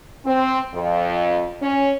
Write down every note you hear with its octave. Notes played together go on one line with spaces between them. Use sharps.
C4
F2
C#4